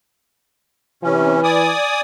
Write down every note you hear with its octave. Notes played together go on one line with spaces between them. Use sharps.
C3 E3 C#4
D5 G#5 D#6